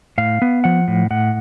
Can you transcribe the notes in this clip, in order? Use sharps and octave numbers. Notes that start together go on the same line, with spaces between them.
A2 F5
B3
F3 F#5
A2
A2 F#5